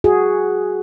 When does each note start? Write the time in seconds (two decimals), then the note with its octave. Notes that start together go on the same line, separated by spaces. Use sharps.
0.04 F#4 G#4